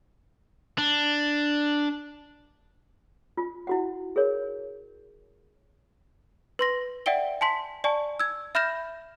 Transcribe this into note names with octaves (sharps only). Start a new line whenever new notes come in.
D4
F4
E4 F#4 F#5
G#4 A#4 C#5
B4 C6 A#6
D5 E5 F#5 G5 D7 G7
G#5 A5 C6 B6
D5 G#5 A5 C#6
E6 G#6
E5 B5 F6 G6 A#6 E7